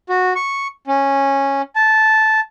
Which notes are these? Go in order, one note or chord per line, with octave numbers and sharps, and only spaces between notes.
F#4
C#6
C#4
A5